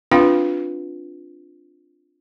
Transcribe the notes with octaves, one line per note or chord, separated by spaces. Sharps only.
C4 D4 F4 B4 F5 G5